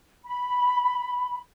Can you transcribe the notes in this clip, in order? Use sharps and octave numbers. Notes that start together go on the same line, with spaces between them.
B5